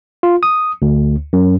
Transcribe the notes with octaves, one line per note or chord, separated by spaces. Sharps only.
F4
D#6
D2
F#2